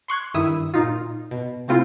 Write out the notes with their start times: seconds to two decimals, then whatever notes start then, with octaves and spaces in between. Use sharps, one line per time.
0.08 C6 C#6 F#6 G#6
0.34 G2 D#3 E4 D#6 E6
0.74 A#2 D#4 F4
1.31 B2
1.68 C3 A3 C4 E4 F4